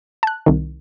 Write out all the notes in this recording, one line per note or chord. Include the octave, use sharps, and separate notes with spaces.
A5 F#6
C2 D#3